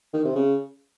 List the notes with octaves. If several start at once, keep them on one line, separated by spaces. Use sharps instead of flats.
D#3
C3
C#3